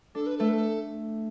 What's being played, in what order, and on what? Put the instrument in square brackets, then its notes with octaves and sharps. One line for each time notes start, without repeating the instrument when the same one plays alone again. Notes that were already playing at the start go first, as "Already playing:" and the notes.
[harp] D4 [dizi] A4
[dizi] B4
[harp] A3 [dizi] A4
[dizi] B4
A4